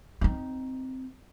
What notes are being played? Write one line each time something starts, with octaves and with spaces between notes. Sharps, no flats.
C4 D#4